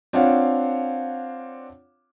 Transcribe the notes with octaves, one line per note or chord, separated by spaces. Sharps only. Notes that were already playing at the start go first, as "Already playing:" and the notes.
C4 D4 F4 C#5 F5 F#5